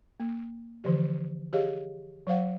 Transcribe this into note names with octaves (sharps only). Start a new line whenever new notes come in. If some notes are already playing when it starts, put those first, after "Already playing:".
A#3
D3 E3 F3 G4
G4 G#4 C#5 D#5 F5
F#3 C5 F5 F#5